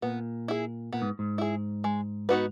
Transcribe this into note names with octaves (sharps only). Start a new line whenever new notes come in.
A#2 B3
E4 G#4
A#2 B3
G#2
G#2
E4 G#4
G#3
B3 D#4 F#4 B4